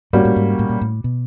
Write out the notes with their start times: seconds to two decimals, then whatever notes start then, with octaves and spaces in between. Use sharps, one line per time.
0.13 G#2 G3 A#3 C#4 F#4
0.25 A2
0.36 G#2
0.59 A2
0.69 A#2
0.81 A2
1.04 B2